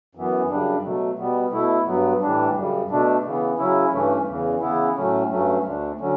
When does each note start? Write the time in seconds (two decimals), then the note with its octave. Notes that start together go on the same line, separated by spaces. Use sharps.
0.15 F#2 E3 B3
0.50 F#2 C#3 G3 D4
0.84 B2 F#3 A3
1.18 B2 G3 B3
1.52 B2 A3 E4
1.86 G2 F#3 B3
2.21 A2 E3 G3 D4
2.55 F#2 C#3 G3
2.89 B2 A3 D4
3.24 C#3 E3 B3
3.59 C#3 F#3 C#4 E4
3.92 G2 E3 A3 C#4
4.26 E2 C#3 E3
4.61 C#3 E3 B3 E4
4.96 A2 F#3 A3 C#4
5.30 G2 F#3 A3 C#4
5.64 D2 D3 A3 D4
5.99 D3 F#3 C#4